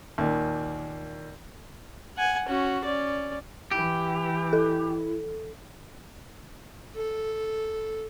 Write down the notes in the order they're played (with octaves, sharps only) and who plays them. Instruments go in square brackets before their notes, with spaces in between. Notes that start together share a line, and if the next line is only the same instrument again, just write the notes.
[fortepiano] D#2 A#2
[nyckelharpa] F#5 G#5
C#4 F#4
C#4 D5
[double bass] E3 [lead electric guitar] G4
[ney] E4 [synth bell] A4
[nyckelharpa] A4